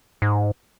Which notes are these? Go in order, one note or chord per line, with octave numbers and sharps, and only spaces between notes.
G#2